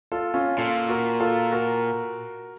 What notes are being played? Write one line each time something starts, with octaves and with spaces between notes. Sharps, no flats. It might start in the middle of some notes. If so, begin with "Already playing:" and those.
F4 A4
C#4 F4
A#2 F4 A4
F#4 A#4
F4 A4
F#4 A#4